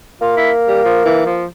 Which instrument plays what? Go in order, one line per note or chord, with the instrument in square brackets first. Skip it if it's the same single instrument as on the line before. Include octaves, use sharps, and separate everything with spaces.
[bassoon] A#3 [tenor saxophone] F4
[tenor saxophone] E4
G3
F3
E3
F3